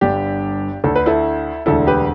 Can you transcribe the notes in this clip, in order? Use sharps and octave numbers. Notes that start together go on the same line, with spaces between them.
G1 G2 D3 D4 G4
D2 D3 A4
B4
E4 A4
E1 D2 D3 E4 A4
G4 B4